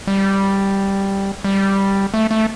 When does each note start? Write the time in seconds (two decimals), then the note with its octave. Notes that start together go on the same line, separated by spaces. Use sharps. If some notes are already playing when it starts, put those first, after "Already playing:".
0.07 G3
1.44 G3
2.14 A3
2.31 A3